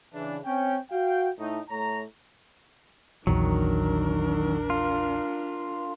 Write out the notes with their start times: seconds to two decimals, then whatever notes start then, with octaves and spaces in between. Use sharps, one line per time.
0.14 C#3 E3 D4
0.45 C4 C#4 G5
0.91 F#4 F5 G5
1.39 A2 A3 D#4
1.70 A2 A3 C#5 A#5
3.27 A#1 E2 D#3 F#3 D4 A#4
4.70 F4